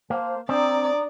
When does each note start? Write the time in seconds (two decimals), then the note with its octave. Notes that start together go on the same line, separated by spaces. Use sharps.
0.10 A#3 C5 A5
0.49 C4 D4 D5 A#5 D#6